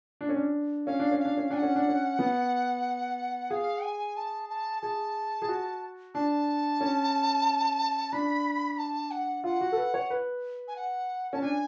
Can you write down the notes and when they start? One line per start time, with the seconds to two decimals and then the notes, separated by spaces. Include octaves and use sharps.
0.21 D4
0.29 C#4
0.37 D4
0.86 C#4 F5
0.99 D4
1.12 C#4
1.20 F5
1.25 D4
1.37 C#4
1.50 D4 G#5
1.57 F#5
1.62 C#4
1.76 D4
1.88 C#4
2.19 B3
3.50 G#4 F5
3.83 G#5
4.17 A5
4.49 A5
4.82 G#4 A5
5.42 G#4
5.49 F#4
6.15 D4 A5
6.81 C#4
8.12 D4 B5
8.78 A5
9.11 F#5
9.44 F4 F#5
9.61 F#4
9.72 A4
9.77 B4
9.94 C#5
10.10 B4
10.68 G#5
10.76 F#5
11.33 C#4 A5
11.42 D4 G#5